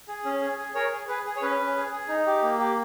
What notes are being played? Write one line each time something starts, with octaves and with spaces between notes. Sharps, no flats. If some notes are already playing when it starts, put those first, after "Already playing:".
G#4
C#4
G#4
G#4
G#4 A#4 C#5
G#4
G#4 B4
G#4
C#5
C#4 B4
C#4
G#4
G#4
D#4
G4
A#3
G4